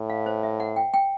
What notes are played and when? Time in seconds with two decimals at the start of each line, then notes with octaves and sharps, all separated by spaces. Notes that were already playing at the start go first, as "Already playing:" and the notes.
Already playing: A2
0.10 F5
0.26 C5
0.43 E5
0.60 F#5
0.76 G5
0.94 G5